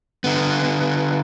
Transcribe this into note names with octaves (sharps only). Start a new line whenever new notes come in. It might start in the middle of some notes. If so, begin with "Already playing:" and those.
D3 B3